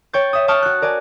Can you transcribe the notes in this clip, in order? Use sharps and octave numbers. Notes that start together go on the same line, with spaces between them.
C#5 G5 C#6 G6 A6
E5 D#6
G5 A5 C#6 D#6 F6
F#4 F#6
A#4 D5 G#5